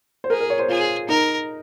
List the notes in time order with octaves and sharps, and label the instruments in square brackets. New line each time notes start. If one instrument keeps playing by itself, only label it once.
[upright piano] C5
[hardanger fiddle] G#4 [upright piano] A#4
[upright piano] A#4
C#5
C5
[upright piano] F4 [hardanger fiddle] G#4
[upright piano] D#4 [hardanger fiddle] A#4